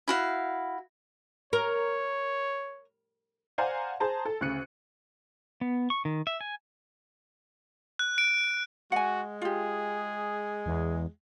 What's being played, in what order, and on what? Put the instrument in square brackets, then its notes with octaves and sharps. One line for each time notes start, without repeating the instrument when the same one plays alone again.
[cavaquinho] E4 F#4 F5
[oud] A#4 [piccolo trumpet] C#5
[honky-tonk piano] C5 D5 F5 F#5 G#5 A#5
G#4 C5 A5 A#5
A4
D2 C#3 F#6 C#7 D#7
[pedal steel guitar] B3
C#6
D#3
E5
G#5
[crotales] F#6
D7
[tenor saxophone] G#3 [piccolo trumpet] F#4 [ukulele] F#5 G#5
[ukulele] F4 G4 [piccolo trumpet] G#4
[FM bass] E2